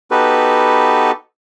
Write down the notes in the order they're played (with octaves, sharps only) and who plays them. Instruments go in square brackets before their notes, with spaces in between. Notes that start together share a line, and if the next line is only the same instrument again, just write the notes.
[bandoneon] B3 D#4 F#4 G4 A4 B4